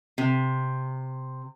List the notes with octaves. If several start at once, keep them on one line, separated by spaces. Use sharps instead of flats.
C3